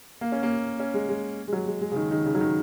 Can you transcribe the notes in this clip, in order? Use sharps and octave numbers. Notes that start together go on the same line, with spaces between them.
A#3
C#4
A#3
C#4
G#3
G#3
G#3
F#3
G#3
G#3
C#3
D#3
D#3
C#3
F#3
D#3